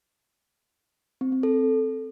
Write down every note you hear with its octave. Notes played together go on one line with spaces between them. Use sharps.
C4
C4
A4